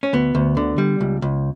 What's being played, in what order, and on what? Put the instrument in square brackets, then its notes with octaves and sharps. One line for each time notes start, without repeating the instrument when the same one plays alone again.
[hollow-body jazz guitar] C#4
D2 B3
D2
D3
G3
C#2
C#2